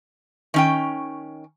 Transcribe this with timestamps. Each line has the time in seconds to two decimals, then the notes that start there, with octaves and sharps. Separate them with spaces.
0.54 D#3 C#4 G5